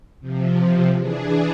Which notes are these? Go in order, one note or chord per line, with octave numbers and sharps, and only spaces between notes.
C3 F3
E3 D4 G#4